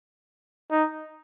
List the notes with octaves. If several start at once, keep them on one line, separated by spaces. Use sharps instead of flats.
D#4